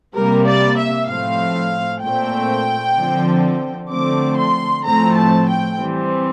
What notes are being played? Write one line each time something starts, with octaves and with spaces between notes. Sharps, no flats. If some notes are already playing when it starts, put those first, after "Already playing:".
C3 G3 A#3 A#4
D5
E5
A2 F3 A3 C4 F5
A#2 A3 C4 G5
D3 F3 C4
D3 F3 A3 C4 D6
C6
A2 F3 A3 C4 A#5
A5
G5
E3 G3 C4